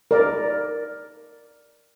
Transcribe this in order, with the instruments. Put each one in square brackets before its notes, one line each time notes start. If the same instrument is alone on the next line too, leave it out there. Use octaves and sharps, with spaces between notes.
[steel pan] A#4 D5